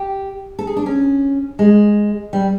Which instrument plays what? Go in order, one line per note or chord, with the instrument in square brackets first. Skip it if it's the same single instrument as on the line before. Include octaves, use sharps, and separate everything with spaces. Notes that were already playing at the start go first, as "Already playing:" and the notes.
Already playing: [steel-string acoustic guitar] G4
A4
G#4
D4
C#4
G#3
G3